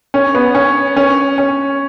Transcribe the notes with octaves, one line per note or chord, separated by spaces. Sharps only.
C#4
B3
C#4
C#4
C#4